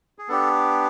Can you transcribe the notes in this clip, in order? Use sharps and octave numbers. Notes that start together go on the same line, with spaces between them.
G#4
B3 D4 G4 A4